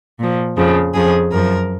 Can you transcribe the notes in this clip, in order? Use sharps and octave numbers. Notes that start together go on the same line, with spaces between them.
A#2 F3
F2 C#3 F3
F2 C#3 F3 G#4
F#2 F3 A#4